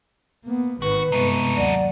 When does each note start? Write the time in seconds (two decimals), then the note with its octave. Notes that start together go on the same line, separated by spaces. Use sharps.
0.45 A#3 B3
0.82 G#1 D#3 F#4 B4
1.12 G2 C3 G#3 A3 B3 D#4 C#6
1.57 D#2 F#3 D5 F#5